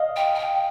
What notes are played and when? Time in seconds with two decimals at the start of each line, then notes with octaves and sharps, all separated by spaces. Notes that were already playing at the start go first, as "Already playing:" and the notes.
Already playing: D#5 F5
0.16 G5
0.35 G#5
0.38 G5